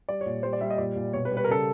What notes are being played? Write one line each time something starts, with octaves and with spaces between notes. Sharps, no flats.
G3 D5
C#5
A#2
G3 C5
D5
G3 E5
D#5
A#2 D5
A#2
B2 C#5
B4
G3
B4
A#4
C#3 A4